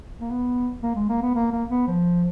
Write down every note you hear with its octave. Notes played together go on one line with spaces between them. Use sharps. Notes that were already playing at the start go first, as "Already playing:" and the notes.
A#3
B3
A#3
G#3
A#3
B3
A#3
A#3
B3
F3